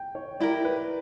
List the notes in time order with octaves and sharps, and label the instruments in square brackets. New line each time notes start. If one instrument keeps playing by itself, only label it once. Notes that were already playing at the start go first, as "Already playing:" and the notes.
Already playing: [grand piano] G5
C#5
[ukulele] E4 G4 A#4 [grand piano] D5
[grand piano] B4